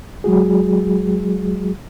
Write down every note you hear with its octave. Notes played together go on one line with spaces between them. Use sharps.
F#3 G#3 F#4 G#4